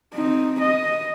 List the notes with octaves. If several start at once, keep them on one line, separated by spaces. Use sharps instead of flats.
C4 D#4
D#5